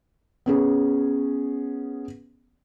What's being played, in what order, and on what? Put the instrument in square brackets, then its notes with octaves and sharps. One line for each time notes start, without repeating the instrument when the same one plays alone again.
[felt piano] B3 C#4 G#4